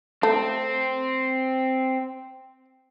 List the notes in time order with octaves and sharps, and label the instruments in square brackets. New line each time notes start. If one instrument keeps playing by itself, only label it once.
[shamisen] A3 [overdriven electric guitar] C4